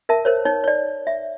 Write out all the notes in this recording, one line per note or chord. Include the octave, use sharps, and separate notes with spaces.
A#4 E5 A5
A#4 C5 C#5
D#4 C#5
C#5 D5
E5